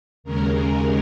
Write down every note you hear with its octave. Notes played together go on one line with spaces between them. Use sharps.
D#2 C#3 G#3 C#4 A#4